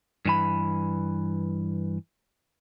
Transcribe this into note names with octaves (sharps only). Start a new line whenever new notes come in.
G2 E3 B5